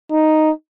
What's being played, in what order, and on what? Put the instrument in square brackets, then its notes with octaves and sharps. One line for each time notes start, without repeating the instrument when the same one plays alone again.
[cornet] D#4